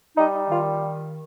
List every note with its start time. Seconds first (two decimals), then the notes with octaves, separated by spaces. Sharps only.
0.17 G3 D#4
0.49 D#3 F4